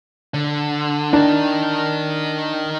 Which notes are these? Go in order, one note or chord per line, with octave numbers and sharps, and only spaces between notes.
D3
D4 D#4 A#4